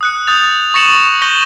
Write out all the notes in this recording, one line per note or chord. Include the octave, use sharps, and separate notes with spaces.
D#6 F#6 C#7
D#6 F#6 G6 A6 F7
C#6 A6 A#6 C#7 E7 F#7
C#6 G6 A#6 D#7 F#7 G7